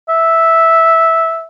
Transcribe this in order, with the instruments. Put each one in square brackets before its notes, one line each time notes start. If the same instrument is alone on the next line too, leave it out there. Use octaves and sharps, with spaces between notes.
[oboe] E5